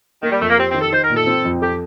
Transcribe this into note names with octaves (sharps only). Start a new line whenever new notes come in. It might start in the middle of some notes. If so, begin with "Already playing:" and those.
D#3 A#3
G3
F2 A3
A#3
C4 G4
C4
D#3
A4
D#4 C5
A#4
A#2
A4
C4
F2
G4 A4